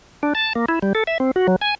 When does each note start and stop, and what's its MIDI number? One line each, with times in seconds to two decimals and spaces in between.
0.23 0.33 62
0.35 0.53 81
0.56 0.65 58
0.69 0.79 64
0.82 0.93 55
0.95 1.04 69
1.07 1.18 76
1.20 1.31 60
1.36 1.47 66
1.48 1.56 54
1.62 1.75 80